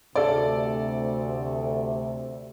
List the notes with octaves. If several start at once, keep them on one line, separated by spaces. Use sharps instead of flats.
D2 C3 A4 D5